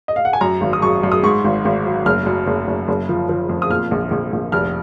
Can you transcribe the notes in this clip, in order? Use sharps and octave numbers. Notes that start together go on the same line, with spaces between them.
D#5
F5
F#5
G#5
F#2 A#5
G#1
D#6
F#2 C#6
F#2
D#6
G#2 C#6
G#1
G#1
F#3
F#1 F6
F#2
F#1
F#1
F#1
F3
F3
F2
D#6
A#2 F6
A#1
A#1
A#1
F1 F6